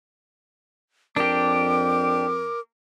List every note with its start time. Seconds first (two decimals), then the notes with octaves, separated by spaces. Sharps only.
1.16 F2 D4 G4 A#4 D6